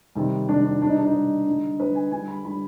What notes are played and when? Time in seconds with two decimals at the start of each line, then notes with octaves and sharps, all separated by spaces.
0.15 C3 D#3 G3
0.48 C3 D#3 G3 D4
0.65 D4
0.82 G3 D4
0.86 B2 D#4
0.98 D4
1.05 D#4
1.14 B2 G3
1.46 D3 G3
1.79 D3 G3 B4
1.95 G#5
2.11 D3 G3 G#5
2.28 B5
2.45 D3 G3 B5